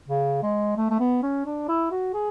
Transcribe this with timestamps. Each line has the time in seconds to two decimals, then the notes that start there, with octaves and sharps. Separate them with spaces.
0.08 C#3
0.43 G#3
0.77 A3
0.90 A3
1.00 B3
1.23 C#4
1.45 D4
1.68 E4
1.91 F#4
2.14 G#4